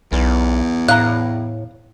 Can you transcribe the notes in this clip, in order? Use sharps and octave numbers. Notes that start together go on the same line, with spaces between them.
B1 E2
A2 F5 A#5 F#6